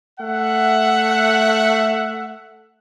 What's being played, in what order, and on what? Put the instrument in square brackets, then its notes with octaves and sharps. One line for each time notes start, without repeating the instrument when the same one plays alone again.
[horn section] A3 E5 F#5